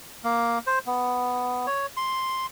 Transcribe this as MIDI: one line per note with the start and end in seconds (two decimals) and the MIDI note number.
0.24 0.59 58
0.67 0.79 72
0.87 1.66 59
1.67 1.86 73
1.97 2.46 84